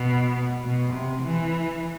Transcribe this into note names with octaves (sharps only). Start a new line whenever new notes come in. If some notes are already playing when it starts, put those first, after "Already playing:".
Already playing: B2
B2
C3
E3